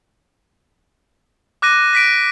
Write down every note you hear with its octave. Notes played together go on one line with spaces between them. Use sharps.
D6 F#6 A#6 D#7
A#6 B6 D7